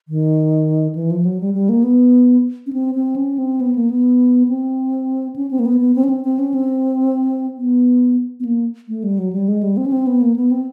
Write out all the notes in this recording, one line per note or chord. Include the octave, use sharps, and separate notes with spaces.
D#3
E3
F3
F#3
G3
G3
A#3
B3
C#4
C4
C4
C#4
C4
B3
A#3
B3
C4
C#4
C4
A#3
B3
B3
C4
C#4
C4
C4
C#4
C4
B3
B3
A#3
A3
G3
F#3
G3
G#3
G3
C4
C#4
C4
B3
A#3
B3
C4